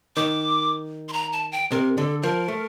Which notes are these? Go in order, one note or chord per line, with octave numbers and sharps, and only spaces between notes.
D#3 D6
C6
A#5
A5
G5
C3 A#4
D3 A4
F3 A#4
A3